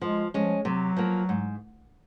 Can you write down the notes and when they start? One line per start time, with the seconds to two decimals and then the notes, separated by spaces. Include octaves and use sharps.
0.01 F3 G#3
0.33 F3 G#3 C#4
0.65 C3 F#3
0.97 F3 A#3
1.29 G#2